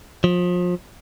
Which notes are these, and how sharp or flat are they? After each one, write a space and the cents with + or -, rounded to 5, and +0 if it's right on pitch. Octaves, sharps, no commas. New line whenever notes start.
F3 +30